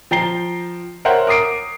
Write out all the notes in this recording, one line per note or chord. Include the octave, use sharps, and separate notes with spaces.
F3 G5 A#5 C7 G7
A#4 C5 C#5 E5 F#5 G5
A#4 D6 D#6 C7 D7